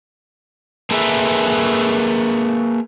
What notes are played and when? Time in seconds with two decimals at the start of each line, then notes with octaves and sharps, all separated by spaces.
0.91 A#3 G#4 A4 B4 E5